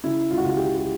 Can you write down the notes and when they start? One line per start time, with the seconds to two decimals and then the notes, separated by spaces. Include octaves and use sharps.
0.04 C#3 E4
0.31 F4
0.38 F#4
0.44 C#2 F4
0.57 G4
0.77 G4